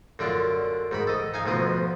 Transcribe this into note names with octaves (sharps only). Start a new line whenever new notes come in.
F#2 D3 D4 F4
G#2 D#3 B5
A4 D#5
D#4 F5 G#5
D2 B2 F3 D#6